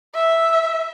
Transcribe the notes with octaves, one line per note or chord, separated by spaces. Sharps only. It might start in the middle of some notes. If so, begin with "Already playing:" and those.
E5